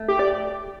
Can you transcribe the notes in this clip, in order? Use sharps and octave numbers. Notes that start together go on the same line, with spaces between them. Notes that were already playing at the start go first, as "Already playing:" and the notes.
Already playing: A3
G4
D5